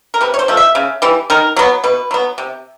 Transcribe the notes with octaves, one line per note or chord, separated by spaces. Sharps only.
A#4
C3 B4
C#5
C5
F3 A3
E5
C#3
E3 G3
D#3 A#4
F#3 B3
B2 B4
F#3 B3
C3